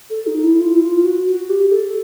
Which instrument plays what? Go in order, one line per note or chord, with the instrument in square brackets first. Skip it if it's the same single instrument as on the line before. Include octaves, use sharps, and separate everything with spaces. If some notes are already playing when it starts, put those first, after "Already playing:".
[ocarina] A4
D#4
E4
F4
E4
F4
F#4
F#4
G4
A4